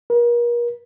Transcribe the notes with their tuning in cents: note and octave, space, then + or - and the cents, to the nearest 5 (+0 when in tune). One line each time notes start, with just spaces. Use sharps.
A#4 +40